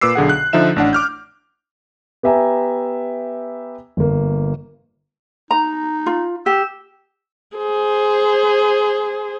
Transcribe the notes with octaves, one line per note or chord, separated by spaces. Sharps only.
A#2 B4 D6 E6 C7
B1 D3 G#4 F#5
F#6
D3 F3 D#4 E5 E7
A1 D4 F#5
D6 F6 G6
B3 G4 E5 G#5 A#5
G1 A#3
D#4 A#5
F4
G4 E6
G#4 C5